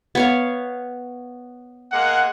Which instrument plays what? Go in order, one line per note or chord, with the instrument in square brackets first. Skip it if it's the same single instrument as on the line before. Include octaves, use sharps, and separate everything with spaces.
[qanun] B3 C#5 F5
[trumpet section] G#3 A#3 F#5